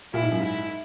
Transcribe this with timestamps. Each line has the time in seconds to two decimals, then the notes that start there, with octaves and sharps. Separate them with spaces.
0.14 A#2 E4
0.23 G#2
0.31 F#2
0.40 G#2 E4